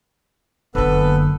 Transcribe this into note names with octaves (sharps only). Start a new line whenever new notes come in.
F#1 D3 B3 A4 B4